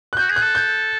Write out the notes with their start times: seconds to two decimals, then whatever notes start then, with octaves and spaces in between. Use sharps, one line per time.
0.13 F#6
0.17 F#4 G6
0.30 G#4
0.36 F#6
0.42 A4
0.55 G6